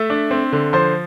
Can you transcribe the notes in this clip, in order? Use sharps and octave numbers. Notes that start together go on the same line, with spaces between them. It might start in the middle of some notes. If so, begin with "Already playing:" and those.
Already playing: A3 E5 E6
D4
C4
D3
F3 C5 C6